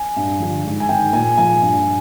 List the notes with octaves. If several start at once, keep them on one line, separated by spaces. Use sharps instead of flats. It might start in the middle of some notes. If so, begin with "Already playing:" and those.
Already playing: G#5
G2
D3 F3
G#2
G#5
D#3 G5
A#2 G#5
F3 G#5
G2